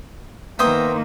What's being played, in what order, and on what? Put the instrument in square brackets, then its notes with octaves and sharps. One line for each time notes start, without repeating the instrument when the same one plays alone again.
[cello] D#3 A#3 [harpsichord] B3 E5 G5 [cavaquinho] C5 C6 D#6